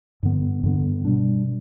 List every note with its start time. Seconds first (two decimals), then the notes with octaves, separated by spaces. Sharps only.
0.23 G2 D3 B3
0.63 G2 D3 B3
1.05 B2 G3 D4